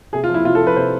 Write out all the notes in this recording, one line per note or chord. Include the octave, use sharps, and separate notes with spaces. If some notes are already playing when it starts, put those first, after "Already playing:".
C3 G#4
F4
F3
E4
C3 F4
A4
F3
B4
C3 C5